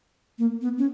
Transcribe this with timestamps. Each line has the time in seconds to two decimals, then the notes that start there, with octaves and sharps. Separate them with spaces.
0.38 A#3
0.61 B3
0.78 C#4